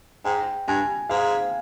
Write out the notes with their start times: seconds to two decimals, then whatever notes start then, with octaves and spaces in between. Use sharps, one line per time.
0.25 G#2 G5
0.68 G2 G#5
1.10 G#2 F5